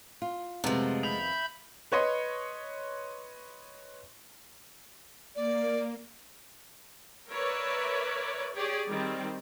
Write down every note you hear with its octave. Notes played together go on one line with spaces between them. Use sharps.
F4
F2 C3 D#3 G#3 A3 B3
E5 B5 G6 F7
B4 C#5 D#5 C6
A#3 D5
A#4 B4 C#5 D5 E5
G4 G#4 C#5 D5
D#3 G3 C4